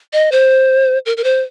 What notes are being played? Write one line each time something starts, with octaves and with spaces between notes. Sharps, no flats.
D#5
C5
A#4
A#4
C5